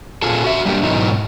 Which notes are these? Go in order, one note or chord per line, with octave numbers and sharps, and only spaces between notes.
A#2 F4 G#4 A4
F#4 E5
G3 A#3 D4 F4 G4
G#2 B2 D#3 F#3 D#4 E4